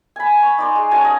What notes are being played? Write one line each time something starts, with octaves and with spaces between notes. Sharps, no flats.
G#5 B5
C#6
D#4 D5 C6
G#3
C#4 F#4 G#5 A5
D#5 F5